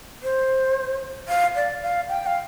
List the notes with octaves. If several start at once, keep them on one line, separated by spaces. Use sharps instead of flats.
C5
F5
D5
F5
G5
F5